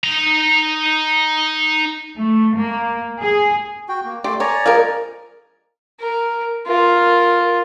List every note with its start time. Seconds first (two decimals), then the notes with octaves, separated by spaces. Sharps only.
0.04 D#4 A#5
2.17 A3
2.56 A#3
3.19 G#4
3.89 F#4 G5
4.05 A#3
4.24 A3 G4 D5 C6
4.40 C#5 D5 G#5 A#5
4.66 F3 G#3 A#4
6.00 A#4
6.67 F4 A#4